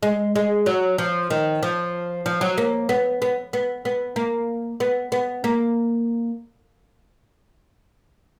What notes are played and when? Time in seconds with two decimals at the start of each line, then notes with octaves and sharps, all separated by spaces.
0.03 G#3
0.36 G#3
0.66 F#3
0.98 F3
1.30 D#3
1.63 F3
2.26 F3
2.41 F#3
2.58 A#3
2.89 B3
3.22 B3
3.53 B3
3.85 B3
4.16 A#3
4.80 B3
5.12 B3
5.44 A#3